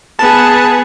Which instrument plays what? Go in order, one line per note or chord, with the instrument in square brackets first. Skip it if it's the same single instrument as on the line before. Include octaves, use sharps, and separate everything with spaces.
[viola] B3 G#4 [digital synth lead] A5